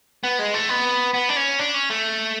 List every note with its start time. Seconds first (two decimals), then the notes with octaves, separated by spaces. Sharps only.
0.24 B3
0.39 G#3
0.54 A3
0.69 B3
1.14 B3
1.29 D4
1.36 C#4
1.59 D4
1.74 C#4
1.90 A3